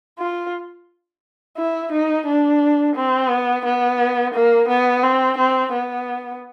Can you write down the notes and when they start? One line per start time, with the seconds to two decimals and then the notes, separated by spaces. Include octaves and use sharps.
0.19 F4
1.57 E4
1.92 D#4
2.26 D4
2.95 C4
3.29 B3
3.65 B3
4.34 A#3
4.68 B3
5.03 C4
5.37 C4
5.72 B3